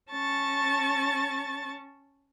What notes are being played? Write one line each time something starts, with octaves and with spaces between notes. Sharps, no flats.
C#4 A5 C#6 A6